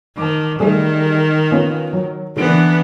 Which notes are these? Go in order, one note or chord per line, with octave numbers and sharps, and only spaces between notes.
D#3 A5 D6
D#3 G3 A3 G#4
B3 C#4 F4
F#3
D3 E3 A#3 B3 D4 D7